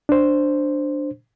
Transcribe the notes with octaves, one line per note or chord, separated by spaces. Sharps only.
D4 C5